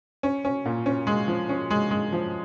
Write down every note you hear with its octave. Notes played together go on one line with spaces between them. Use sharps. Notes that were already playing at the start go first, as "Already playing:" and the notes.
C#4
C#4
A#2
C#4
G#3
F3
C#4
G#3
G#3
F3